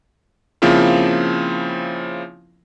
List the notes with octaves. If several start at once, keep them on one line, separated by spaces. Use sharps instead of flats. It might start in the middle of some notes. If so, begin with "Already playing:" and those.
C#3 F3 A#3 C4 E4 F4